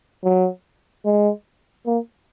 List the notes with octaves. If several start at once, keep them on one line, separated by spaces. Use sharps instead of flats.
F#3
G#3
A#3